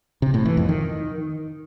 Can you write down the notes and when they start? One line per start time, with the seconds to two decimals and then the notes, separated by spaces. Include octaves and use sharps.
0.22 C3
0.34 A2
0.45 E3
0.57 F2
0.69 D#3